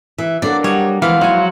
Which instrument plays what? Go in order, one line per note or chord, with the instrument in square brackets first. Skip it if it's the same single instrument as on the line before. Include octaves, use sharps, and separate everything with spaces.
[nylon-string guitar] E3 [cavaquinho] E5
[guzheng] F#3 A#3 [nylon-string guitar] B3 D4 A4 [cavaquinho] D5
[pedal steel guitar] G3 [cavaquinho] C#5 [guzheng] D#5 F#5
[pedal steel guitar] E3 [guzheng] F3 G#3 B3 [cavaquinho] F5
[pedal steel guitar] F#3 F#4 [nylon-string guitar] B3 E4 [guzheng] C5 G#5